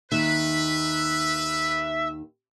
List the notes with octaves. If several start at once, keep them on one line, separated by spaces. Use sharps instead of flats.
D#2 D#3 D#4 B4 E5